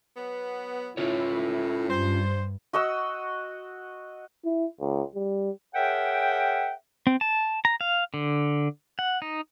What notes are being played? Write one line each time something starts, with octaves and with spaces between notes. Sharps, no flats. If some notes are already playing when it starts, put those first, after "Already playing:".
F#3 B3
A2 C#4 E4 F4 C#5
G2 C5
F#4 D#5 F#5 E6
E4
C#2
G3
G#4 A#4 C#5 E5 F#5 G5
C4
A5
A#5
F5
D3
F#5
D#4